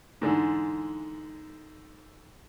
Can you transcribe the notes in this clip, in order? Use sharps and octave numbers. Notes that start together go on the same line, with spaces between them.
G#2 D3 E3